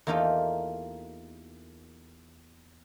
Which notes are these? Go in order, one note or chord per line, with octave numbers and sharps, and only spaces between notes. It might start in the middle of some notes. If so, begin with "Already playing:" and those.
E2 A#3 D#4 F4 G4 A4